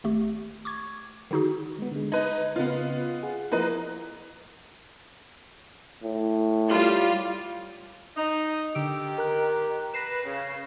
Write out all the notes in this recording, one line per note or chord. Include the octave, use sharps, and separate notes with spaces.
G#1 A3 G4
C#6 D6 G#6
D3 D#3 D#4 F#4 G#4
G#3 B3
D3 G#3
D#4 B4 D#5 G#6
C#3 B3 F4 B4 D#5
G#4 F#5
F3 A#3 E4 B4 D#5
A2
G3 F4
D#4
D3 D#3 G4 E6 D7
A#4 A#5 F#6
B4 A#6 C7 E7
C#3